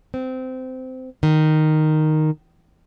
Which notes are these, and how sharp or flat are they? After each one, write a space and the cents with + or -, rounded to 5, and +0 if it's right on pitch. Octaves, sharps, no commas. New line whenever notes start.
C4 -20
D#3 -5